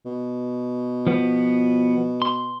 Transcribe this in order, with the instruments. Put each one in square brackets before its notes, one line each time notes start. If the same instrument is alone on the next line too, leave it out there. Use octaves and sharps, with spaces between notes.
[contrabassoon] B2
[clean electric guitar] F3 B3
C6